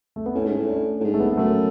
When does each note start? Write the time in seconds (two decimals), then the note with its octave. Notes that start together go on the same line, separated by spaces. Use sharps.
0.16 A3
0.26 B3
0.35 A2 C#4
0.45 G#2
0.57 A2
0.69 D4
1.00 A2
1.04 G#2
1.14 A3
1.20 B3
1.31 B3
1.37 F#2 A3